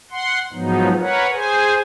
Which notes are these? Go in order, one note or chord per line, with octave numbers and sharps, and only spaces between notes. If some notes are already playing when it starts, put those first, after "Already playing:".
F#5 C6
G#2 F3 F#3 B3 D#4
A#4 B4 C#5 F#5
G#4 C5 G#5